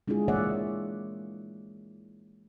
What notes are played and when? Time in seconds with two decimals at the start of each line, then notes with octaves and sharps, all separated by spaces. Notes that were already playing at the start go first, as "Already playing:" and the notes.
0.08 G#3 D4 E4 F4 G#4
0.28 E3 A#3 C#5 D5 E5 F#5